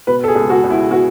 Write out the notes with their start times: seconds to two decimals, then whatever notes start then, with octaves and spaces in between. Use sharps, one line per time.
0.07 B2 B4
0.24 A4
0.28 G#4
0.35 C#2
0.50 F#4
0.63 C#2
0.70 E4
0.90 B2 F#4